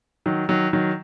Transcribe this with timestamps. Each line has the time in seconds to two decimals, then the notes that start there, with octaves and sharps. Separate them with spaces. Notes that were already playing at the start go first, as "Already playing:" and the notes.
0.26 D#3 F#3
0.49 D#3 F#3
0.73 D#3 F#3